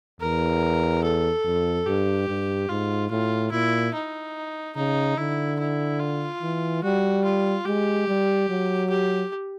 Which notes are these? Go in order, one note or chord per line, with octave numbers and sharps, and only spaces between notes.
E2 A#4
A4
F2
G2 G4
G2
G#2 F4
A2 F4
A#2 E4
D#4
C#3 D#4
D3 E4
E4
F4
E3
G3 F#4
F4
G#3 G4
G3
F#3
G4